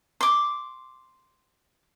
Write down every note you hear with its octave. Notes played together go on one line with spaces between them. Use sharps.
C6 D6